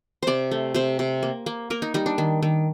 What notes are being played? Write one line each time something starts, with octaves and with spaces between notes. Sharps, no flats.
C3 C5 D5
A3
C3 C5
C3
A#3
A#3
A#3 A#4
D#4
G3 D#4
D4
D#3
D#3